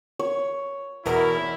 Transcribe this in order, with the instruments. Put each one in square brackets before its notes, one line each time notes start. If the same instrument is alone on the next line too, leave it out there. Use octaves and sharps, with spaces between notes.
[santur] C#5
[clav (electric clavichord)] E2 B2 [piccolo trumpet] E4 [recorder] A#4